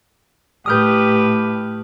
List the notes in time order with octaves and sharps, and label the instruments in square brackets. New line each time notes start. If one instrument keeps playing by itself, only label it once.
[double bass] A2 [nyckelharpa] G4 B4 [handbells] D#6 F6 G6